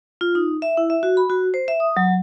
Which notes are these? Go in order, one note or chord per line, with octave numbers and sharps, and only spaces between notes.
F4
D#4
E5
E4
E5
F#4
B5
F#4
C5
E5
D#6
F#3